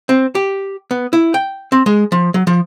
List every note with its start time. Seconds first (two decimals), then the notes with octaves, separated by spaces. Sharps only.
0.09 C4
0.35 G4
0.91 B3
1.13 E4
1.34 G5
1.72 C4
1.86 G#3
2.12 F3
2.34 F#3
2.47 F3